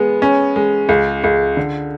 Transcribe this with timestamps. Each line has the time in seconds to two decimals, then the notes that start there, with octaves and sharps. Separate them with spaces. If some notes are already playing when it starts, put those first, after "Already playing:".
Already playing: G#3 B3
0.22 C#4
0.56 G#3
0.89 C#2
1.24 C#2
1.57 D3